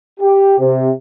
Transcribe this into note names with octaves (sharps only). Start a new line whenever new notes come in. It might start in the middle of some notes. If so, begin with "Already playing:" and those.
G4
C3